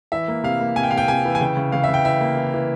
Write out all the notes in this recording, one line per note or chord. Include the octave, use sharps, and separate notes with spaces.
E3 E5
A#3
C3 F5
A#3
C3 G#5
G5
C3 F5
G5
C3 G#5
E3
G#5
C#3 G5
C#3
C#3 F5
E5
C#3
G5
E3 E5
A#3
E3
E3